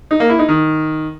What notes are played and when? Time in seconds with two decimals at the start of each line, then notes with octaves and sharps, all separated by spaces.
0.11 D#4
0.20 A#3
0.30 E4
0.39 D#4
0.49 D#3